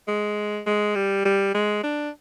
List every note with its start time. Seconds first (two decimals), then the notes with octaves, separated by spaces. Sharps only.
0.08 G#3
0.66 G#3
0.95 G3
1.25 G3
1.55 G#3
1.83 D4